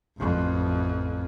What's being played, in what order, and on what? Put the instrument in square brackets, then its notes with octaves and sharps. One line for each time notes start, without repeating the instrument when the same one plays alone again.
[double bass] A1 F2